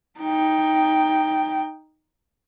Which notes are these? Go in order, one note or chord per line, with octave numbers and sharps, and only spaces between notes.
D#4 G5